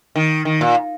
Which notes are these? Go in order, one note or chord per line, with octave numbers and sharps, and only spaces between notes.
D#3
D#3
A#2